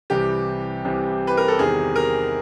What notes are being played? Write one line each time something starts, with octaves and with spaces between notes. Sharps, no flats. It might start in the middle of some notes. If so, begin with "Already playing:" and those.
C2 C3 E3 G3 G4
C2 C3 E3 G3
B4
A#4
A4
E2 C3 D#3 G3 G#4
A#4